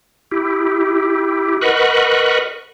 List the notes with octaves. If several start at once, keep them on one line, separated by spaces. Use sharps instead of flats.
E4 G4
A#4 B4 D#5 F#5 B5 C#6